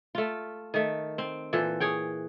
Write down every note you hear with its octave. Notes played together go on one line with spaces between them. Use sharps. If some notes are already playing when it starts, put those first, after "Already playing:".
A3 F4
D#3 A3
C4
A#2 E3 A4
G#4 C#5 G5